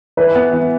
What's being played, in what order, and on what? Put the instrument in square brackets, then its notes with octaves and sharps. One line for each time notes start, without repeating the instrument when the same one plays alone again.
[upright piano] E3 [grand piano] B4
[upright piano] B3
E3